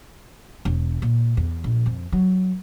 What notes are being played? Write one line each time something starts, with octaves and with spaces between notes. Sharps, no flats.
E1
A#2
E2
A#1
F2
F#3